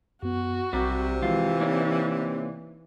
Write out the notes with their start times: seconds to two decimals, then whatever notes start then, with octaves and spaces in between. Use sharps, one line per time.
0.23 F#2 B3 F#4
0.73 B1 C3 G3 C4 A#5
1.22 E3 F3 G#3 F4 F#4
1.60 A#3 C4 D#4 C#5 D5